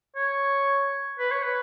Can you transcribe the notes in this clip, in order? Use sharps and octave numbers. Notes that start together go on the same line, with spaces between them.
C#5
B4
C#5
B4